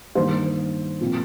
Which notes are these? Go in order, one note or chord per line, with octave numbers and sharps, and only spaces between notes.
G2 D#3 A#3 C5
A#2 F3 C4